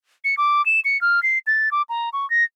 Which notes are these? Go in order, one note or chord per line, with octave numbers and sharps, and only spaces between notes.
C#7
D6
E7
C#7
F6
C7
A6
D6
A#5
C#6
A#6